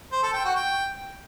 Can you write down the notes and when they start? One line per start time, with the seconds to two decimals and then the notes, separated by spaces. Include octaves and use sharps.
0.12 C5
0.23 A4
0.33 G5
0.44 F#4
0.55 G5